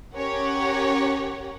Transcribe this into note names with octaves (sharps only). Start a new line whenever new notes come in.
C#4 G4 A#4 C#5 F#5